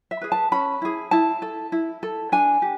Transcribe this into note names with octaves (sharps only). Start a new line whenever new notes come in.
E5
G#4 B4
A5
C#4 B5
E4 G#4
E4 A5
A4
E4
A4
D4 G#5
G4